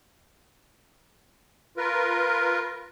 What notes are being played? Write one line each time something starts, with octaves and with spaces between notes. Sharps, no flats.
F4 A#4 B4